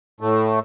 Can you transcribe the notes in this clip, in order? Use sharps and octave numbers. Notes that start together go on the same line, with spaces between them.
A2 A3